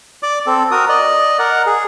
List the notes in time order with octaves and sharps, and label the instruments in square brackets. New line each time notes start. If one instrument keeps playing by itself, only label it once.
[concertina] D5 D6
C4 A4
F#4 A#4 D#6
D5 D#5
A#4 F#5
G#4